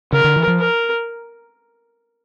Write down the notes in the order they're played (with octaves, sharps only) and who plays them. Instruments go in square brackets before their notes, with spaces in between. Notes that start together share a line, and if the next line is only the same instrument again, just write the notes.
[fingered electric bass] C#3 [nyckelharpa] A#4
[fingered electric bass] D3
E3
F3
[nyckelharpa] A#4